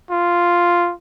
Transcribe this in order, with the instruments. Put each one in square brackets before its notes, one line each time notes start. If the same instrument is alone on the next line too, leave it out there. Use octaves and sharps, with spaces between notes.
[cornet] F4